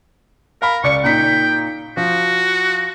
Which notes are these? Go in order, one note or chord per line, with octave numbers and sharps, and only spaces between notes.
A#4 F5 B5
C#2 D5 C#6 C#7
A#2 D#4 G5 B6
F3 F#4